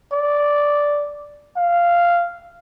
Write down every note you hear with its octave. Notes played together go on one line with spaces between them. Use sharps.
D5
F5